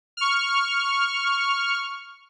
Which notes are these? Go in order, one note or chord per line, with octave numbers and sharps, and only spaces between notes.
C#6 F6